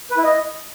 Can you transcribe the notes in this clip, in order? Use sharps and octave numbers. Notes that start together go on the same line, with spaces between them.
B4
E4
D#5